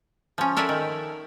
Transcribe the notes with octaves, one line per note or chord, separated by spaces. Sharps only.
F3 C#4
A4 A#4 D5 E5 F#5 G#5
D#3